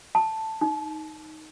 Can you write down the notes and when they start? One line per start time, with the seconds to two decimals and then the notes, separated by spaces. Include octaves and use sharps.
0.15 A5
0.61 D#4